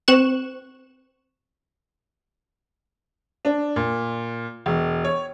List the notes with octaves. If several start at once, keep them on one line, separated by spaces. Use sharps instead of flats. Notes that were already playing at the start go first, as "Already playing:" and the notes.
C4 C#6 F#6 E7
D4
A#2
E1
C#5